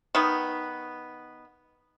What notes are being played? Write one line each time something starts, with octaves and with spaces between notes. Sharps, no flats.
D#3 B3